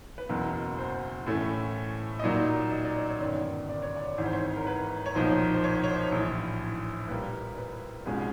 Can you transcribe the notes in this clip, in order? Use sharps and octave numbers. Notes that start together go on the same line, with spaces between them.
B4
F#1 E2 B2 F#3 A#4
C5
A2 E3 A3 C#4
D#5
A#2 F#3 A#3 D#4 D5
D#5
D5
C#5
C#5
G1 F#2 D#3 D5
D5
C#5
D5
G#1 G#2 E3 C#5
C5
C#5
A#4
B4
C#5
B1 A#2 F3 A#3 D#4 C5
C5
C#5
C#5
C5
A#1 A2 E3
A#2 G3 A#3 B4
B4
C2 B2 G#3 C#4 F4